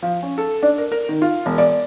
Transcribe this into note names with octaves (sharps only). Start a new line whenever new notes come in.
F3
C#4
A4
D4
A#4
A#4
D#3
F4
E1
D5